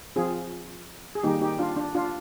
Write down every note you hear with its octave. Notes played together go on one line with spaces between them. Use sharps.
F3 C4 F4 G#4
G#4
D#3 G3 A#3 D#4 G4
D#4 G4
D4 F4
D4
D4 F4